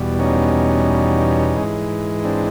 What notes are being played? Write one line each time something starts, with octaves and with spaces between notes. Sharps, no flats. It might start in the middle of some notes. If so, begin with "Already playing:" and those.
Already playing: E2 B2 G3
C#4 D#4
G#2 E3 G#3
C4 D4